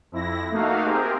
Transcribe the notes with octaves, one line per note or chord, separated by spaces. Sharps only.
F2 E4 A#6
A3 A#3 D#4 F#4 F5
C4 G4 G#4 A#4